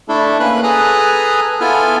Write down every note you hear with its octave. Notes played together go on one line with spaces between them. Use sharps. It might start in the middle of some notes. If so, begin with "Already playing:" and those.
A3 D4 E4 A4
A#3 C#4 B4 B5 F#6
G#4 A4 B4 G#5 A#5 F#6
B3 E4 F4 A4 G#5 F6